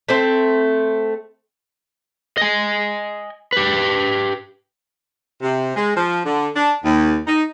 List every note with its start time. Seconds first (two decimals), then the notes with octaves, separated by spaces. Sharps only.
0.09 A3 C4
2.37 D#5 G#5
3.52 G4 B4
5.42 C3
5.75 G#3
5.96 F3
6.25 D3
6.55 D4
6.84 D#2
7.27 D#4